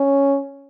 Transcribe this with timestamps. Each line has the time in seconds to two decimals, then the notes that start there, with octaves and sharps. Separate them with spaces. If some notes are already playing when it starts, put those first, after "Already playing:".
Already playing: C#4